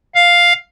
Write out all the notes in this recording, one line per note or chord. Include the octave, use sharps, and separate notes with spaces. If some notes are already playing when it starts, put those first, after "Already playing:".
F5